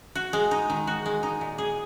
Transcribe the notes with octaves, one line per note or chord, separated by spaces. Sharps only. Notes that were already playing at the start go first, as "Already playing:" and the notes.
F#4
G#3
D#4
D#3
F#4
G#3
D#4
A#2
G#4